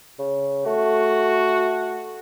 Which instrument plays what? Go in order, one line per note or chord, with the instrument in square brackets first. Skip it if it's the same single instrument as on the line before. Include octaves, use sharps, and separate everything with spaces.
[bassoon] C#3
[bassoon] A3 [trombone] F#4